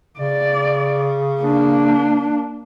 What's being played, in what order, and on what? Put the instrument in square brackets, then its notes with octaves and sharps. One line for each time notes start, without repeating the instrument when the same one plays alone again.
[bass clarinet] C#3 [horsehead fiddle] D5
[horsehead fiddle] A#3 D4